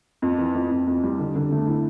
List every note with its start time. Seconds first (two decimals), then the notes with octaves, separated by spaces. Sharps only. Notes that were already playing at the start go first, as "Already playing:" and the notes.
0.22 F2
0.38 E3
0.54 F2
0.71 F2
0.87 F2
1.04 G3
1.19 D3
1.35 D3
1.51 A3
1.67 E4